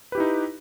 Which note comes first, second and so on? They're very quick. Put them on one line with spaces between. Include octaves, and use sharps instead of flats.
B4 G4 E4 D#4